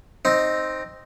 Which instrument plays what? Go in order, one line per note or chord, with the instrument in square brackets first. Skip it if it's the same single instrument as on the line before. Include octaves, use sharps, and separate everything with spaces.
[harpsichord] C4 D#4